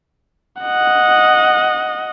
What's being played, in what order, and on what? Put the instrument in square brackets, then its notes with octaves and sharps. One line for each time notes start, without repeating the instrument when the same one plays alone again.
[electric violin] D#5 F#5